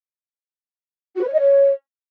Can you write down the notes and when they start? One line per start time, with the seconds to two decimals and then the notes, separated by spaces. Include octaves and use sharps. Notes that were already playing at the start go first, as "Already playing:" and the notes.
1.15 F#4
1.21 B4
1.27 C#5
1.33 D#5
1.39 C#5